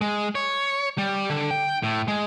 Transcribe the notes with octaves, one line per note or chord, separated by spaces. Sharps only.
G#3
C#5
G3
D3
G5
A2
G#3